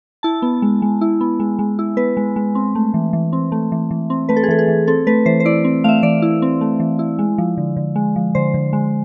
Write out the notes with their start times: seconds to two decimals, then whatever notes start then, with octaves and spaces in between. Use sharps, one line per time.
0.23 E4 A5
0.42 B3
0.62 G#3
0.82 G#3
1.01 E4
1.21 B3
1.40 G#3
1.59 G#3
1.79 E4
1.97 B3 B4
2.17 G#3
2.36 G#3
2.55 C4
2.75 A3
2.94 E3
3.13 E3
3.33 C4
3.52 A3
3.72 E3
3.91 E3
4.10 C4
4.29 A3 B4
4.36 A4
4.43 G#4
4.49 E3 A4
4.58 G#4
4.68 E3
4.87 C4 A4
5.07 A3 B4
5.26 E3 C5
5.40 C5
5.45 E4 D5
5.64 C4
5.84 A3 E5 F5
6.03 E3 D5
6.22 E4
6.42 C4
6.61 A3
6.80 E3
6.99 E4
7.19 G#3
7.38 F3
7.58 D3
7.76 D3
7.96 G#3
8.16 F3
8.35 D3 C5
8.54 D3
8.73 G#3